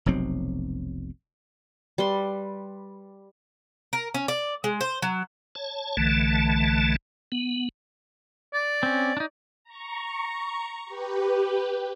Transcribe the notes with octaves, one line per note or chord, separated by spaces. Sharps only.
F1 B1 F#3 C4
G3 B4 C6
A#4
C#4
D5
G#3
C5
F#3
C#5 A5
B1 D3 E3 A3 A5
B3
D5
C4 C#4
D4 D#4
A#5 C#6
G4 B4